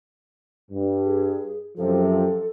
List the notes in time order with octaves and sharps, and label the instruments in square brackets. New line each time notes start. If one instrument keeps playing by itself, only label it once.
[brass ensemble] G2
[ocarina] G#4
[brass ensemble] F#2 C3 F3 [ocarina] A4